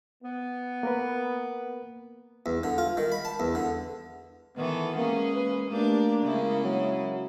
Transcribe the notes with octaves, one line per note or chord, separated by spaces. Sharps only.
B3
A#3 A#4 B4
E2
D3
F4
D#3
B5
A5
E2
D3
D#3 E3 B3 A4
G#3 A#3 C#4 G#4
B4
A3 A#3 D4 G4
C#3 G#3 E4
F#3